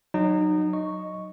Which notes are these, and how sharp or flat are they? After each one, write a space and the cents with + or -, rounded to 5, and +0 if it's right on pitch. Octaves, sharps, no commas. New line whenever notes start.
F#3 +0 D#4 -25
D#5 +0 C#6 +0